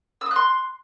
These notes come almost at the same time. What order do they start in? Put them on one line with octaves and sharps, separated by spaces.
E6 D#6 F#6 C6